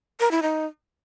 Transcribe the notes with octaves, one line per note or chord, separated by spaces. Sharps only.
A#4
E4
D#4